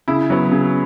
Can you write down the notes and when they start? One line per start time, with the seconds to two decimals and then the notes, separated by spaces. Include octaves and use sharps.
0.08 C#3 E4
0.30 F#3 B3
0.52 C#3